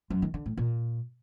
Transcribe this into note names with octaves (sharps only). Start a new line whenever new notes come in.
F#2
D#3
D3
A2
A#2